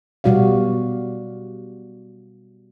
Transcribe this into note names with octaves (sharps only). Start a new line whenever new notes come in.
B2 G3 F#4 D5 F5